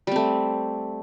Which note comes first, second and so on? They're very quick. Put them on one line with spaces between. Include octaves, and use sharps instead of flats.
G3 C4 A3